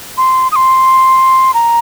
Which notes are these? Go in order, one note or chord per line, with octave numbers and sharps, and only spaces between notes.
C6
D#6
C6
A#5